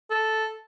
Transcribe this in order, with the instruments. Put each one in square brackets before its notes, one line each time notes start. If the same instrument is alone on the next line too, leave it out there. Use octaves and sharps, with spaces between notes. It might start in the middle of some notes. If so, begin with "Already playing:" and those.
[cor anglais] A4